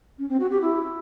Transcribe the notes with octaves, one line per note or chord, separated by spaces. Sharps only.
C#4
C4
F#4
G4
E4